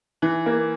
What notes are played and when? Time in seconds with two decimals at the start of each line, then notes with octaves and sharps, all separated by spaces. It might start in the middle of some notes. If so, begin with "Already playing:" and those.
0.22 E3
0.46 A#3